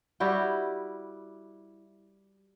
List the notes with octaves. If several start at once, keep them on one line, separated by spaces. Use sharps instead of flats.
G3 E4 F#4 G5